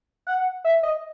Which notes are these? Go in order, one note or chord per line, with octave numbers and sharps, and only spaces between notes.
F#5
E5
D#5